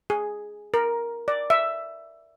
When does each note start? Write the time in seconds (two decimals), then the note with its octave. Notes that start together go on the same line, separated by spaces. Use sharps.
0.10 G#4
0.74 A#4
1.28 D5
1.50 E5